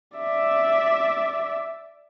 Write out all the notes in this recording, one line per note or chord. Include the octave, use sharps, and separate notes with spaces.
D5 E5